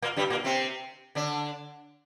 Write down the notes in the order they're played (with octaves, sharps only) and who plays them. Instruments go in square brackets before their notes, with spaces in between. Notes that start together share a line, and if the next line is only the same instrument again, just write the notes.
[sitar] A#2 A#3
G2 G3
A#2 A#3
C3 C4
D3 D4